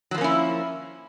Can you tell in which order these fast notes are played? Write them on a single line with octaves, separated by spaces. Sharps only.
F#3 F3 A#3 C#4 E4